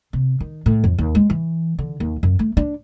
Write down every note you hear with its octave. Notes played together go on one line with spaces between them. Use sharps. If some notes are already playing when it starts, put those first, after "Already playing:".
C3
D#3
A2
F2
D#2
G#3
E3
D3
D#2
F#2
A3
D4